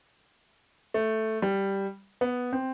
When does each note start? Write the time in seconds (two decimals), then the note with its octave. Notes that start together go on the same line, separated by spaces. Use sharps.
0.94 A3
1.42 G3
2.21 B3
2.53 C4